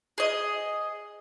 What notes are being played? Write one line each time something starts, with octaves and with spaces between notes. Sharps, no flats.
G#4 D#5